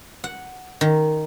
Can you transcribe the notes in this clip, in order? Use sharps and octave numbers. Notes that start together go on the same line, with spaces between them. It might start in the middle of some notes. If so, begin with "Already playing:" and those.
F#5
D#3